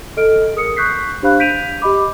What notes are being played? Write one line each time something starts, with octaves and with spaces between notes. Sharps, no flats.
A4 D#5 F6 D7
G#4 A#4 D#6 C#7
C#6 F#6 G6 B6 C7
D4 G4 C5 F5 B5 F#6
G6 B6 D7 D#7 F7
G4 D#5 B5 D6